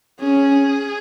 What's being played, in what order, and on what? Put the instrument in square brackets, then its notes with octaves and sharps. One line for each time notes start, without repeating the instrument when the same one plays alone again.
[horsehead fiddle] C#4 [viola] G#4